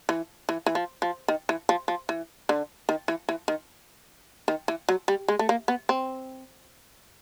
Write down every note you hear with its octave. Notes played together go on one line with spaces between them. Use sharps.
E3
E3
E3
F3
F3
D#3
E3
F3
F3
E3
D3
D#3
E3
E3
D#3
D#3
E3
F#3
G3
G#3
A3
A#3
B3
C4